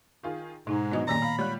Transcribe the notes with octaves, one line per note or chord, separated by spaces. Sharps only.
D#3 F4 G#4
G#2 B2 G#3 D#4 A#5
E3 F#3 B3 D4 D#4 D#5 D#6
F#2 A#2 D#3 G3 A#3 D5 A#5
F5 B5
G3 G#3 F4 C#5 F#6